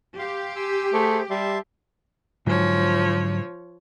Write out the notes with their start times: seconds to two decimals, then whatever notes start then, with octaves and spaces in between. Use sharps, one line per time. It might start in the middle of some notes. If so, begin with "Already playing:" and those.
0.19 G4 F5 C6
0.56 G#5 C6 E6
0.93 A3 G#4 C5
1.30 G3 E5 A5 C6
2.47 G#2 D3 F3 F#3 C#5